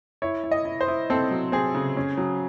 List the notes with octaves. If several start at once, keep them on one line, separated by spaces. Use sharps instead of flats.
E4 C#5
E4
D#5
E4
C5
E4
C4 A4
F#3
C4 G#4
C#3
C#4
F#3